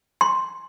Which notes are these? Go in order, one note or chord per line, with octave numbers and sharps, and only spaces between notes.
C6